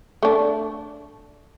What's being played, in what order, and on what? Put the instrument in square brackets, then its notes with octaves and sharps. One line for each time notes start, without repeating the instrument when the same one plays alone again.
[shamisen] A3 D4